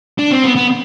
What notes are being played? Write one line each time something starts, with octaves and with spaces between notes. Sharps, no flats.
D4
C4
B3
B3